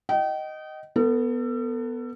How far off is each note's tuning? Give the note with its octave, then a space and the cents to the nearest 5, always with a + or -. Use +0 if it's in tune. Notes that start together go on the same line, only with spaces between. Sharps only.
D#5 +0 G5 -35
B3 +0 A4 +35